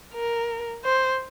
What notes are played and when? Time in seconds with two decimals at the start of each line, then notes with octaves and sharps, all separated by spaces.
0.14 A#4
0.84 C5